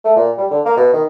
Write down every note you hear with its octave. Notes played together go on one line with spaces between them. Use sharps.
A3
A#2
G3
D3
A#3
B2
D#3